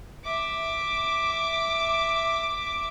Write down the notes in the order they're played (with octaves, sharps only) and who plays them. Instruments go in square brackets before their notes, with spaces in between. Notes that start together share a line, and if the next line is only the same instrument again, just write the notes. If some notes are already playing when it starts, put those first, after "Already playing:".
[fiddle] E5 D6